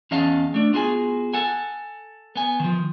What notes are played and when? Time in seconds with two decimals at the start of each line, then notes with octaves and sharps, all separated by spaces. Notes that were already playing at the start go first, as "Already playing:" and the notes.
0.11 E2 C#4 D#5 F5 F#5 A5
0.54 A3 D4
0.73 B3 F4 F#4 G#4 G#5
1.33 A4 F#5 G#5
2.36 B3 G#5
2.60 D#3 F3